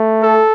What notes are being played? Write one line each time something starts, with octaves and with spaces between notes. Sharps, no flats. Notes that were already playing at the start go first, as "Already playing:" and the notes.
Already playing: A3
A4